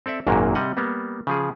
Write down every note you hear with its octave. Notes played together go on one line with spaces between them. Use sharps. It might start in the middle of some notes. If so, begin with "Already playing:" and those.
C4 A4 D5 E5
G#1 F#2 A#2 F#3 A#3
C3 G3 D#5 F#5
G3 A#3 B3
C#3 F3 G#4